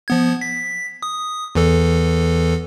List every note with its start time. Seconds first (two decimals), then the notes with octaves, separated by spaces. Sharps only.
0.08 F3 B3 G#6
0.41 B6
1.03 D#6
1.55 E2 E3 A4